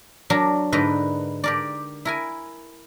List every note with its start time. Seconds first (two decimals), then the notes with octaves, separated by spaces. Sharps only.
0.30 F#3 D4 A#4
0.72 G#2 D3 D#4 A#4 B4
1.44 G4 A#4 D5
2.05 E4 A#4 G#5